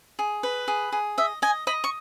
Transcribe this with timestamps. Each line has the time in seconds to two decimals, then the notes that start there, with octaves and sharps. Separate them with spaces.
0.19 G#4
0.43 B4
0.68 G#4
0.92 G#4
1.18 D#5 E5
1.42 D#5 G#5
1.67 D#5 B5
1.84 C#6